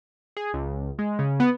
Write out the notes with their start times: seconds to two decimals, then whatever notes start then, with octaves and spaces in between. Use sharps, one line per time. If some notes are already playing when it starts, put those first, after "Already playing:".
0.37 G#4
0.53 C#2
0.99 G#3
1.19 C#3
1.40 B3